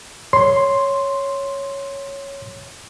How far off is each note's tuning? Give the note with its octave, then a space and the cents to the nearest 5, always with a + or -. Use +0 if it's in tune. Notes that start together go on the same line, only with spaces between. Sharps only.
C#5 +0 C6 +0